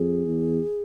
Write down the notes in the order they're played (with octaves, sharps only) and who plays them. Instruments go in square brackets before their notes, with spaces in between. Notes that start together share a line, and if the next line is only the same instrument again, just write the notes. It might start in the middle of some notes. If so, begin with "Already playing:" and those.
Already playing: [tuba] F2 [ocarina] G#4
[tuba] E2